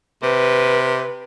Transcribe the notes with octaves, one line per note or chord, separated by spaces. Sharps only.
C3 B4